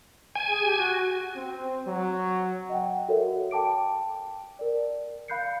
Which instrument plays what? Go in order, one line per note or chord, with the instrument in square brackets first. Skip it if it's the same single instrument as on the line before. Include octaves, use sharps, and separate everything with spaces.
[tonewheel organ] G#5
[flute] G#4
G4
F#4
[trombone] C4
F#3
[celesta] D#5 F#5 G5
F#4 A4 A#4 C#5 E5
G5 A5 D6 D7
A#4 D5
F5 B5 F#6 G6 C7 C#7